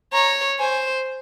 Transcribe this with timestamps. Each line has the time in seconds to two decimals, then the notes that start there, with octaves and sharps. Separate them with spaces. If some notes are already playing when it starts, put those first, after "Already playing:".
0.13 C#5 A#5
0.59 C5 G#5